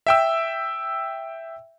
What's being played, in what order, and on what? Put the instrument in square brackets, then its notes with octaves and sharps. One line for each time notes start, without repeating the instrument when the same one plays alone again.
[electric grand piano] E5 G5 E6